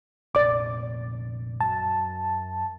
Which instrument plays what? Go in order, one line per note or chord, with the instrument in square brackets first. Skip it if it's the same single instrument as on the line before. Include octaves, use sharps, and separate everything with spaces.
[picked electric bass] F1 A#1 [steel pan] D5 D6
[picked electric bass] F#2 [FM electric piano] A5